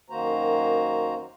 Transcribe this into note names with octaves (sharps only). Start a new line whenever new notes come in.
F#2 D#3 A#3 F#4 C5 A#5